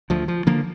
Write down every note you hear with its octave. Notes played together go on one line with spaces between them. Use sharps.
D2 F3
F3
D3 F3 A#3